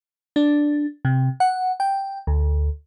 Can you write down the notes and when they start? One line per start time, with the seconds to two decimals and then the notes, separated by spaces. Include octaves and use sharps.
0.36 D4
1.05 C3
1.40 F#5
1.80 G5
2.27 D2